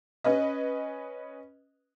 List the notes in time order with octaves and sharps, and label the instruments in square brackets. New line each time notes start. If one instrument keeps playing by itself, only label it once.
[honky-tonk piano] C#4 B4 D#5